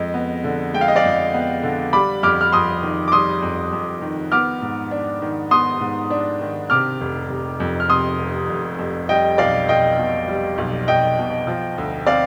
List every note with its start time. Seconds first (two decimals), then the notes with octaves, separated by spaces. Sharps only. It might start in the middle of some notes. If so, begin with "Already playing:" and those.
Already playing: F2 G#3 D#5
0.14 B3
0.44 D3
0.74 G#3 G5
0.81 F5
0.88 D#5
0.96 D5 F5
1.04 F2
1.34 B3
1.63 D3
1.93 G3 B5 D6
2.23 F2 D6 F6
2.41 F6
2.52 F2 C6 D#6
2.83 D#3
3.08 D6
3.12 G3 C6 D#6
3.42 F2
3.73 F2
4.02 D#3
4.32 B3 D6 F6
4.61 G#2
4.91 D4
5.22 D#3
5.51 B3 C6 D#6
5.80 G#2
6.10 D4
6.41 D#3
6.70 C3 D6 F6
7.01 F1
7.30 F1
7.60 F2
7.80 F6
7.89 C3 C6 D#6
8.19 F1
8.49 F1
8.79 F2
9.09 G3 D#5 G5
9.38 B1 D5 F5
9.69 B1 D#5 G5
9.98 B2
10.28 G3
10.58 B1
10.88 B1 D#5 G5
11.18 B2
11.47 F3
11.78 D2
12.07 C4 D5 F5